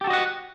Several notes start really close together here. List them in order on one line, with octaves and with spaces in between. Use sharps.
G4 A4 F#4 D#5 F#5